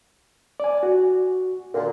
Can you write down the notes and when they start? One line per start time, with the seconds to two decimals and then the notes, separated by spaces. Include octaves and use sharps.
0.60 D5 G#5
0.83 F#4
1.74 A#2 D3